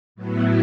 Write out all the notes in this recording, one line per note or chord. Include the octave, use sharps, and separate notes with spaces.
A2 F#3 B3 E4